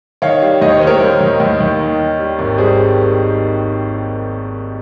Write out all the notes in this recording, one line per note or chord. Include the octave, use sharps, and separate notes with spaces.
D#3 C#5 F5
G3
D#2 D#5
C#5
D#3 C5
A#4 C#5
D#2
D#2
D#2
D#2
D#3
D#3
G3
G#1
G3 G#4 C5